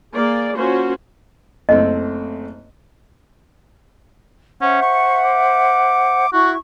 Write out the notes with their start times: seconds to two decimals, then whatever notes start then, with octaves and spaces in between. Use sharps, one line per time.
0.15 A#3 G#4 D5
0.55 A#3 C#4 F4 F#4 C5
1.69 F#1 A3 C4 D#5
4.61 C#4 C5 E5 F#5
4.82 C#6
5.25 D6
6.33 E4 F#4 C#6